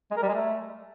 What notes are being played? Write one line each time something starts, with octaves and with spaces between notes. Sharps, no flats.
G#3
A#4
G3
G#3
A3